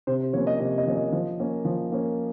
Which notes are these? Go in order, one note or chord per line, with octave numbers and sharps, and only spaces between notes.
C3 C5
C5
F3 A#3 C#4 C#5
D#5
C3 D#5
D#5
F3 A#3 C#4
D#5
F3
A#3 C#4
F3
A#3 C#4